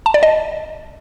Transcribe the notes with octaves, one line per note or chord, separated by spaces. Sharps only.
A5
D5
D#5